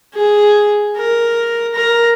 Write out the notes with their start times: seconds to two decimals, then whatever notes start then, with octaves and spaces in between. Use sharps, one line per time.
0.15 G#4
0.97 A#4
1.75 A#4 A#5